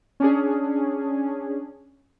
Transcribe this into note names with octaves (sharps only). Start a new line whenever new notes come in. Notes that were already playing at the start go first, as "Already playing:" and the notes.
C#4 D4 G#4